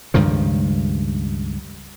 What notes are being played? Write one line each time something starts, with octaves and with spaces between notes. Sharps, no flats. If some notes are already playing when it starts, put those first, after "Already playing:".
C#2 G2 D#3 F3